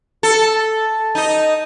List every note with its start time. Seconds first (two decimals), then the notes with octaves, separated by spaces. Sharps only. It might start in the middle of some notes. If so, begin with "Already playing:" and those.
0.23 A4
1.15 D#4 D#5